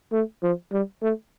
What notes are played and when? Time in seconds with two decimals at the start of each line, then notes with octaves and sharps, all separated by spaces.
0.12 A3
0.43 F3
0.72 G3
1.02 A3